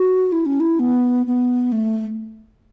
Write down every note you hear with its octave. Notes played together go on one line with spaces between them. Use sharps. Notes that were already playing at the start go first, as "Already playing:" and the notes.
Already playing: F#4
E4
C#4
E4
B3
B3
A3